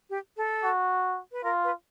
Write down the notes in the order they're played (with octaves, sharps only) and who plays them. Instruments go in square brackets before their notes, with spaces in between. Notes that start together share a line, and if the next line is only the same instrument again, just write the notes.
[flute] G4
A4
[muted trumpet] F#4
[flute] B4
[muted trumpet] F4 [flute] A#4
[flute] B4